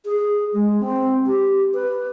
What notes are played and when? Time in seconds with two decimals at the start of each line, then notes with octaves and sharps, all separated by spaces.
0.05 G#4
0.53 G#3
0.80 C4
1.26 G4
1.74 B4